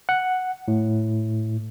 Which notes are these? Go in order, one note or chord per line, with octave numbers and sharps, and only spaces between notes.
F#5
A2